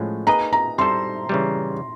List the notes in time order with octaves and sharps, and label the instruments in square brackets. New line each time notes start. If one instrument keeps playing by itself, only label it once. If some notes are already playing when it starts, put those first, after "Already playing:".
Already playing: [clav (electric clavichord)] A2 F3 G#3 C#4 F4
[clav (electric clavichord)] A#3 D#4 G#4 B4 D#5 [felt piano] A#5
[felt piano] A#5
[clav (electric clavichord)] G3 C4 E4 A4 C5 [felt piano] C6
[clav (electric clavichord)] C#3 E3 G3